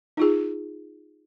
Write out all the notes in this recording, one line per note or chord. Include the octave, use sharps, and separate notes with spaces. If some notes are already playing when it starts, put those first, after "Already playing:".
D#4 F4 G#4